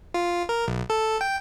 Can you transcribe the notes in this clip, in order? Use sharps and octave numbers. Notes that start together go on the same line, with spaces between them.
F4
A#4
B1
A4
G5